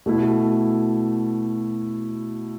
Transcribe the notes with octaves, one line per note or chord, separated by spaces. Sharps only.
B2 A3 E4